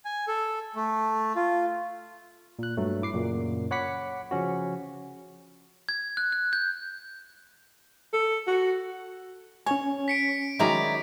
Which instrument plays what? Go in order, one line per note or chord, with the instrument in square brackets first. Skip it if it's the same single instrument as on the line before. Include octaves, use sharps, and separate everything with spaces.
[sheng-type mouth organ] G#5
A4
A3
F4
[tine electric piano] A#2 F#6
G2 F#3 A3
E4 D6 C7
F#2 A#2 C#3
C#5 F#5 B5 D6 B6 C#7
C#3 F3 C#4 F#4
[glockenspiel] G#6
F#6
F#6
G6
[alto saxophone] A4
F#4
[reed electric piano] C#4 G#5 [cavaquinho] C#5
[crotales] B6 C#7 D7
[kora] D#3 F#3 G#3 [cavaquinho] E4 D5 A#5